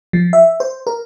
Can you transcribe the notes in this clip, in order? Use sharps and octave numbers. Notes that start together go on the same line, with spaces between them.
F3
E5
C5
A#4